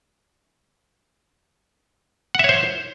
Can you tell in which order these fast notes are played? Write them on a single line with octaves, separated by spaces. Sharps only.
F#5 E5 C#5 C5